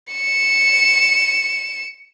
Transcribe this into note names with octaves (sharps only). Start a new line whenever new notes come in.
C#7 E7